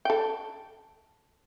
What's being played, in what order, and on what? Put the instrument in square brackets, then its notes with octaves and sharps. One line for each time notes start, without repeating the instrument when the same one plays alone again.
[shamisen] A4 G5